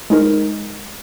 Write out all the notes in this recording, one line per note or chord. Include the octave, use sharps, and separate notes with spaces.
G#3 D#4 A#4